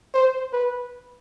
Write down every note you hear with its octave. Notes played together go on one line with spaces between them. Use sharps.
C5
B4